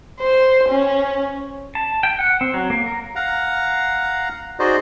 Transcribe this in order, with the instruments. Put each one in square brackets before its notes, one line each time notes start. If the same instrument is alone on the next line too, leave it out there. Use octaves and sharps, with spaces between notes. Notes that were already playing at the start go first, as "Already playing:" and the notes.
[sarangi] C5
C#4
[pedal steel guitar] A5
G5
F#5
C4
F#3
A#3
A#4
[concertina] F5 F#5 A#5
D#4 F#4 G#4 C5 D5 D#5